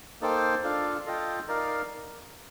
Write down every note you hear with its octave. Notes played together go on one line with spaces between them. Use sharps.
A#3 D#4 A4 C5 G5
D4 F4 A4 D5 F5
F4 A4 D#5 G5
D#4 A#4 D5 F5